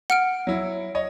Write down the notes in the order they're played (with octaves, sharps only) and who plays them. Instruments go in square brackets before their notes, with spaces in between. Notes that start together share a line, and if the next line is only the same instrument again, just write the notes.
[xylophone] F#5 F6 D7
[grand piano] F#3 E4
C#5 D#5